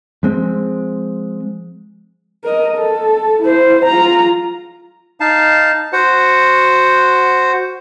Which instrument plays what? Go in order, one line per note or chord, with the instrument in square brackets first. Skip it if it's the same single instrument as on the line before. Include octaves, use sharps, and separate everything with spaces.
[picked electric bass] F3 G#3 C4
[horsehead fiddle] A#4 D#5
A4
E4 C5
F4 A#5
[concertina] D#4 F5 A5
F#4 C5 F#5